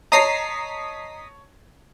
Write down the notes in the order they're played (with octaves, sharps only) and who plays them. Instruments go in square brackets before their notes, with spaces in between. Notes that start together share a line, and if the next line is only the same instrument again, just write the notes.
[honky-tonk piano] C#5 A5 [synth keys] D#5 D#6 B6 [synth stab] A#5 C7